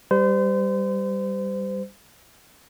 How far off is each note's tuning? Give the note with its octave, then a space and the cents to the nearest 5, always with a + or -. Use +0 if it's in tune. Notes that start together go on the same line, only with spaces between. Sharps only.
G3 +0 C5 -35